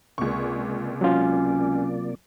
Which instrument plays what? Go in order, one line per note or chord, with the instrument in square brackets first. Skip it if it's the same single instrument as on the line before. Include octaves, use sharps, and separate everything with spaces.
[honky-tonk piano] C#2 C#6 [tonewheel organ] C3 A#3 D5
[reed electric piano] F#3 F4 [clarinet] C#4